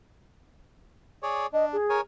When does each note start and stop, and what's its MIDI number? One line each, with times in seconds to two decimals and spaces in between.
1.23 1.46 68
1.23 1.46 73
1.23 1.46 74
1.53 1.77 62
1.53 1.65 75
1.73 1.97 68
1.90 2.01 70
1.90 2.01 73
1.90 2.01 80